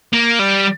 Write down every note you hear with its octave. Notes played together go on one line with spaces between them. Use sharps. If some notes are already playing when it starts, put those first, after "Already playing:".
A#3
G3